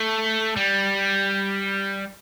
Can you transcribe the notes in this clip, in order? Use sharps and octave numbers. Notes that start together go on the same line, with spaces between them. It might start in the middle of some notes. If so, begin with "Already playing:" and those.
Already playing: A3
G3